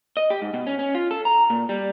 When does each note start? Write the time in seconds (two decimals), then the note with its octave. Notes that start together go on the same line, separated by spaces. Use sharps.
0.17 D#5
0.30 G4
0.42 G#2
0.54 B2
0.67 C#4
0.79 C#4
0.95 F4
1.11 A4
1.25 A#5
1.50 A#2
1.69 G3